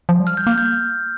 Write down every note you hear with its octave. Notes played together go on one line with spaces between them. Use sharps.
F3
G3
F6
G6
A#3 F6
G6